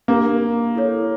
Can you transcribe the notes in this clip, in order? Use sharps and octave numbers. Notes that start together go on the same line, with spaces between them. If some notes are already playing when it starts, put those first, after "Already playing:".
A#3 D4 G4 A#4
E4 A4 C#5